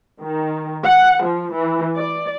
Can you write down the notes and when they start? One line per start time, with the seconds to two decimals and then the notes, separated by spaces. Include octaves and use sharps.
0.22 D#3
0.84 F#5
1.23 F3
1.54 E3
1.97 D5